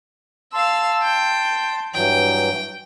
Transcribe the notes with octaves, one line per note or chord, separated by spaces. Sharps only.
F5 A5 C6 E6
G5
G2 E3 F#3 G5